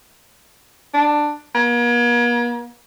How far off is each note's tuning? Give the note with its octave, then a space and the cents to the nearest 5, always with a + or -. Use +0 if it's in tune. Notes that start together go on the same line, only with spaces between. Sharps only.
D4 +10
A#3 +45